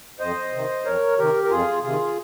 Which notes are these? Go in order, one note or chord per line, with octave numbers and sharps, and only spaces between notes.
F2 C5 D#5
C3 D#3
F2 A#4 C#5
C3 D#3 G4 A#4
A#4
F2 F4 G#4
C3 D#3 F4 G#4